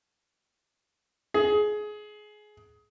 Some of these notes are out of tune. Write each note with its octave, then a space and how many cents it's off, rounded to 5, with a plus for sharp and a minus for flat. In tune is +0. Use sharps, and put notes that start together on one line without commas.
G#4 +20